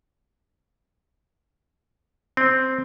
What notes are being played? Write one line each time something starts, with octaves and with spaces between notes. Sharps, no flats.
C4